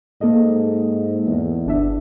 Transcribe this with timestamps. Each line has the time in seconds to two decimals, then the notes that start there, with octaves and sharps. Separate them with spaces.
0.21 G#2 A#3 A4 D#5
1.27 E2
1.66 G1 D4 E5